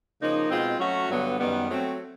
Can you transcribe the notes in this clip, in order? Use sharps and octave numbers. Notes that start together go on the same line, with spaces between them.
C#3 F3 A#3 D#4
B2 G#3 C4 F4
F#3 A3 C#4 F#4
G2 D3 F#3 B3
F#2 D#3 G3 B3
F#3 A3 C4